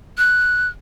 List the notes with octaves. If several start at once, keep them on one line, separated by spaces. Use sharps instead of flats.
F#6